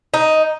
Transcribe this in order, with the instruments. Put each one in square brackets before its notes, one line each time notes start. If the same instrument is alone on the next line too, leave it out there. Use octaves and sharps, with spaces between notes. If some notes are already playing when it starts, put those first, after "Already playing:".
[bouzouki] D#4